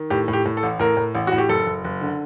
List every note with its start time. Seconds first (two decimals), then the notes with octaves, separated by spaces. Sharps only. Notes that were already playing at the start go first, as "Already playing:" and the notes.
Already playing: D#3
0.10 A2 G4
0.28 A2
0.33 G4
0.46 A2
0.57 A4
0.63 A1
0.80 A2 A#4
0.97 A2
1.15 A1
1.27 A2 F#4
1.38 G4
1.49 F#1 A4
1.66 F#1
1.84 F#1
2.01 D3